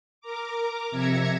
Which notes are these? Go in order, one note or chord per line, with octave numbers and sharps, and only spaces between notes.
A#4 A#5 D6
F2 C3 E5 G#6 A#6 C#7